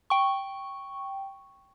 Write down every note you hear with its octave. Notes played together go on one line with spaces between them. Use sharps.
G5 C#6